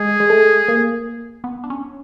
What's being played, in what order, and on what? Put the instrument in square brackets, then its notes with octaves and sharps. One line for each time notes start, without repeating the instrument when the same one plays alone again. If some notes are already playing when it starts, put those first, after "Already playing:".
Already playing: [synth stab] G#3 [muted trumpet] G#4
[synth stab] G#3
A3
A#3
B3
D4
C#4